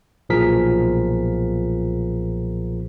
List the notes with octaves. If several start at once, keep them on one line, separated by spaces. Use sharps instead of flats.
B1 A#2 F3 G#4 A#4 B6